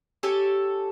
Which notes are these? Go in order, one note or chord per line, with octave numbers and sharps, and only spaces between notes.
G4 A4 C#5 G#5